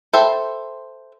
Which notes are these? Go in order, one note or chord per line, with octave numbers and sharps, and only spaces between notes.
A4 C5 E5 G5 B5